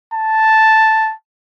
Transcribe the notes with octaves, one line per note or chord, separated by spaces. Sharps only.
A5